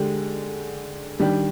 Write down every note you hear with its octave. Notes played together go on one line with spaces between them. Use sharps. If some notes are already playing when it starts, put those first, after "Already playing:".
Already playing: D3 G#3 D4 G4
D#3 G3 D4 G4